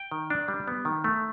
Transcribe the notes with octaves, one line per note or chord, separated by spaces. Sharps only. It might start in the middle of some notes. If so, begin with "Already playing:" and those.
Already playing: G5
D#3
D4
G3
B3
D#3
A3